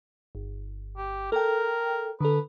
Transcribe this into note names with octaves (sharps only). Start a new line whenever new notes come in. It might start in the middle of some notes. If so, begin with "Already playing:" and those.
G1
G4
A4 A#4 G5
D3 A4 B4